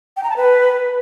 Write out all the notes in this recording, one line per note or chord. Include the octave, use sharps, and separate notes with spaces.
G5
A#5
A5
B4